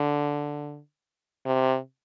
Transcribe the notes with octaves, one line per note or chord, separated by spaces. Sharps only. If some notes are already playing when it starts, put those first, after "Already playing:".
Already playing: D3
C3